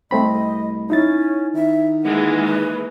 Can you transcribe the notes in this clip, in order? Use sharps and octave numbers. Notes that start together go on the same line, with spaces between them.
C2 A3 C4 D#5 B5
C#4 D#4 E4 A6
D#3 E5
E3 G#3 A#3 F#5
B4